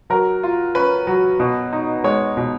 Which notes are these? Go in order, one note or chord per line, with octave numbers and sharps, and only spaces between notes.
F#3 A#4
F4
C#4 B4
F#3
B2
D#4
G#3 C#5
B2